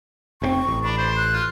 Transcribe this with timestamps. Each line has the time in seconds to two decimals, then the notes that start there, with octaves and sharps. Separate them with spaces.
0.42 F1 A#2 C4 C#6
0.67 A1
0.84 D4 B5
0.98 C5
1.16 F#6
1.33 F4